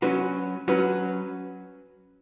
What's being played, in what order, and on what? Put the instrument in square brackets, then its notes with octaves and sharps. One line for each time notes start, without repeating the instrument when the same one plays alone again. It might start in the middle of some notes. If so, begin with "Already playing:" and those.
[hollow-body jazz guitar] F#3 C#4 F#4 B4
F#3 C#4 F#4 B4